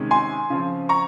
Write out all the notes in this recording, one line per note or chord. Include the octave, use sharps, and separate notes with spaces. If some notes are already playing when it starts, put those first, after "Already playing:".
Already playing: C3 D#3 G#3 C#4
G#5 C6
C#3 F3 C4
A#5 C#6